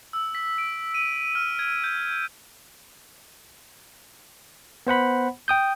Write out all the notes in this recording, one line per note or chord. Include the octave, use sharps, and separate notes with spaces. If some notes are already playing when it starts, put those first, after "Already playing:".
E6
B6
D7
D#7
F6
G#6
G6
B3 C5 F#5 B5
G5 D#6 G6